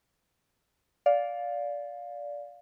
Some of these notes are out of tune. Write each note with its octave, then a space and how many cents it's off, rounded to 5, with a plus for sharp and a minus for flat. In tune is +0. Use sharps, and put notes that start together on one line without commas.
D5 -15 F5 +15